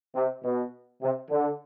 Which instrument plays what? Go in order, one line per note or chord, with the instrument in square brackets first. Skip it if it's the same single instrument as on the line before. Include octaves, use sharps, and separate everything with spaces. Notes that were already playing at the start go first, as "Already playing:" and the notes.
[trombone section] C3
B2
C3
D3